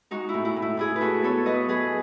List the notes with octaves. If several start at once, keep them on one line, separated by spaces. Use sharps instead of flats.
G#3 D#4 F#4
E4
A2
E4
A2
E4
A2 E4 G#4
B4
A2 F#4 A4
B3 A4 C#5
F#3 B4 D#5
F#3 G#4 B4